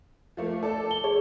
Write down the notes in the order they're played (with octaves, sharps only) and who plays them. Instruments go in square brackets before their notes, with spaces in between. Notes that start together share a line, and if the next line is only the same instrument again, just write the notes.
[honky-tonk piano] F3 A3 A#3
A4 D5 A5
[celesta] G7
[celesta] G#4 [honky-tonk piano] C#5